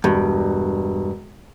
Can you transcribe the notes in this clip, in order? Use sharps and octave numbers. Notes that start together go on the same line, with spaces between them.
E1 G2